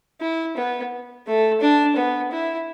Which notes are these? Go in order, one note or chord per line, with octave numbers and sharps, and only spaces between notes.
E4
B3
A3
D4
B3
E4